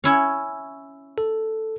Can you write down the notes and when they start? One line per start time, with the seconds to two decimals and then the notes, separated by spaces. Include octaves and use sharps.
0.04 C#4 E4 C#5
1.18 A4